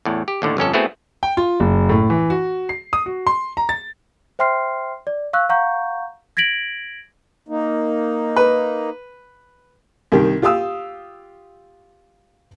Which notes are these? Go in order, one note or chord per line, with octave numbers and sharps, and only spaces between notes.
E2 A2
G4
D#2 A2 D3
G1 F2 C#4 A4
A3 B3 C4 E4 F#4 G#4
G5
F4
F#1
A2
E3
F#4
C7
D#6
F#4
C6
A#5
A6
C5 E5 G5 C6 F6 C7
D5
F5 C#6 E6 F#6
F5 F#5 A#5 C#6 G6
G#6 A#6 B6 D7 F#7
A#3 D#4
B4
C2 D#3 G4
F4 G4 F5 D#6 E6